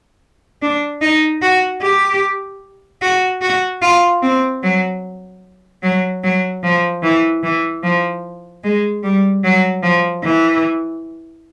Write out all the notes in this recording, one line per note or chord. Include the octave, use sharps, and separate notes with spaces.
D4
D#4
F#4
G4
F#4
F#4
F4
C4
F#3
F#3
F#3
F3
E3
E3
F3
G#3
G3
F#3
F3
E3